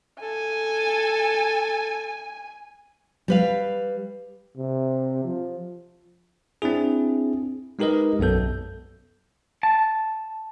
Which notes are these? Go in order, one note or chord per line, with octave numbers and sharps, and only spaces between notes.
A4 G#5
G3 B4 F5
C3
F3
C4 D4 E4 G#4
G#3 D#4 G4 A#4 B4 D#5
B1 F#2 B3 A4 G6
A5